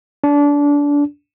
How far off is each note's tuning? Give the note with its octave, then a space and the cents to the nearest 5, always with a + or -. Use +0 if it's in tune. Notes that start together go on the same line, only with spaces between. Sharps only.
D4 -25